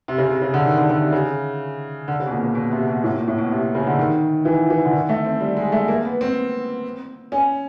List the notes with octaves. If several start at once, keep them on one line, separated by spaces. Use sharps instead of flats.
C3
C#3
C3
C#3
D3
D#3
D3
D3
C3
C#3
D3
C#3
B2
A#2
A#2
B2
C3
B2
A2
A#2
A2
B2
C3
B2
C#3
D3
D#3
E3
E3
D3
D#3
A3
C4
G3
G#3
A3
A#3
B3
C4
C#4